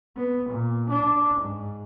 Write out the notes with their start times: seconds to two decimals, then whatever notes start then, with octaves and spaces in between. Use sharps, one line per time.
0.16 B3
0.50 A#2
0.90 D4
1.42 G#2